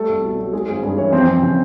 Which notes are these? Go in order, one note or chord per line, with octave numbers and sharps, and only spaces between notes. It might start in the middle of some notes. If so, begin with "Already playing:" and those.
Already playing: G3 A3 A4
C2
B2
F#3
G#3 G#4
G#1 G#4
G2 G#4
E3 C#4 C#5
F2 C4 C5
F2
C#3